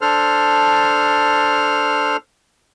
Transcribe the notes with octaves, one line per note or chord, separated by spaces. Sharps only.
D4 A4 C5 F6